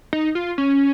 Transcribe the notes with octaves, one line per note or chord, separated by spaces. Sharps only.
D#4
F4
C#4